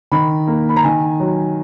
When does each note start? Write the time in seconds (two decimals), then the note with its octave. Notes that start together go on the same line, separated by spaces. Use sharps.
0.12 D#3 B5
0.47 A#3
0.69 B5
0.76 A#5
0.83 D#3 G#5
1.20 F#3